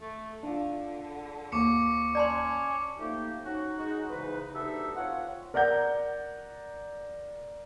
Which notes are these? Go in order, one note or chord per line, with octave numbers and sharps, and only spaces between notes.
A3
D3 D4 F4
D#2 C#6 D6 C#7
C#4 D5 A5 C6
F3 A3 A#3 D#4 G4
C#4 D#4 F#4
G#3 D#4 F#4
E2 G#2 C#3 D#4 B4
D2 B3 D#4 G4 A4 E5
C4 F4 C#5 F#5
A#4 D5 F#5 A#5 G6